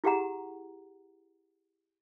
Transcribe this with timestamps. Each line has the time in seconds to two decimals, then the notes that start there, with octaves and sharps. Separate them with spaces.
0.04 E4 G4 G#4 F#5 A#5